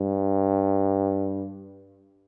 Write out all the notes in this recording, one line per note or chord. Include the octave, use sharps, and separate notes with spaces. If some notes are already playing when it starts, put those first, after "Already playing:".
Already playing: G2